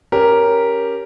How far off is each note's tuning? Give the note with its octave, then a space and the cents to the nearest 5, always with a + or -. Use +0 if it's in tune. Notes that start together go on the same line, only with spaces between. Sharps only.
C#4 +0 G4 +0 A#4 +0